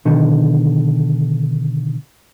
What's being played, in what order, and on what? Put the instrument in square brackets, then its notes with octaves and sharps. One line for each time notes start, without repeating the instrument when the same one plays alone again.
[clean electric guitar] B2 D3 D#3